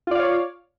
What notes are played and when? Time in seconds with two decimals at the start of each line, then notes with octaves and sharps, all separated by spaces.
0.07 F4
0.11 D5
0.15 F5
0.19 C#5